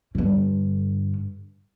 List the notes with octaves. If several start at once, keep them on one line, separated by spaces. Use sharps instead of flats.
G2 D3